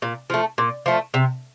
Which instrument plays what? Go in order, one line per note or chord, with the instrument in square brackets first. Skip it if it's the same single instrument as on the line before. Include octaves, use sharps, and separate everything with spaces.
[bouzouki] A#2
F3 A3
A#2
F3 A3
C3